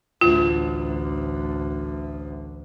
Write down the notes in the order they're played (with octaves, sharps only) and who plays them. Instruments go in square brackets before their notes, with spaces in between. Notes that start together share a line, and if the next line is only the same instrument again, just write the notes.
[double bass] A1 D2 [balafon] F4